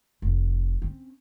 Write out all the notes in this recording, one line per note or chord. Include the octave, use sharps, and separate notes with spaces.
F1 F3
C4 C#4